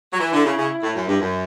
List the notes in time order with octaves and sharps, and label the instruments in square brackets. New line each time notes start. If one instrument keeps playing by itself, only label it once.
[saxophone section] F#3
[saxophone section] E3 [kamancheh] E4
[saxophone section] D3
C#3
C#3
A2
F#2
G2
F#2